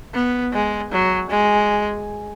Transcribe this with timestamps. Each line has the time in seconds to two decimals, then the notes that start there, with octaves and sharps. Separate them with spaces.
0.14 B3
0.53 G#3
0.92 F#3
1.30 G#3